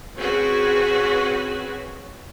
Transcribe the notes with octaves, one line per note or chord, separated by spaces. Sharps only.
C4 C#4 F#4 G#4 B4